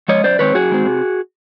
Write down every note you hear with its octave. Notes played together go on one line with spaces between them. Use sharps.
F3 G#3 C#5 D#5
F#2 C5 D5
D#3 G#3 C4 B4 C#5
F#2 F#4 G#4
D#3 G#3 C4
C3